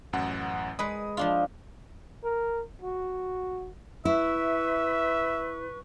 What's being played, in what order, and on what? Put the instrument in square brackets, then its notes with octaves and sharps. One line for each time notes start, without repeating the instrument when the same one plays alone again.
[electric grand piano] A1 F#2 F#5
[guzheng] G#3 B4 [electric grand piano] D#6
[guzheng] F3 D4 F4
[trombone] A#4
F#4
[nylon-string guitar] E4 [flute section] B4 C#6 [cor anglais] E5